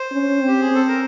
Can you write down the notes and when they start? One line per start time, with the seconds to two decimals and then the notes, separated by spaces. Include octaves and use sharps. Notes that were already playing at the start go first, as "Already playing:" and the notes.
Already playing: C5
0.11 C#4
0.42 C4
0.48 G4
0.61 G#4
0.71 C4 A4
0.88 A#4